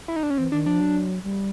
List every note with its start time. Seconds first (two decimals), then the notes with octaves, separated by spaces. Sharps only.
0.08 E4
0.16 D#4
0.23 D4
0.30 C#4
0.38 E3 C4
0.52 D#3 D4
0.66 F3 D4
0.81 F#3
1.24 G3